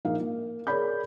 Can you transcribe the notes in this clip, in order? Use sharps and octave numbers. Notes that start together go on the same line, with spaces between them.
A#1 A#3 D#4 F5
A#3
G#4 A#4 C#5 D5 B5 G6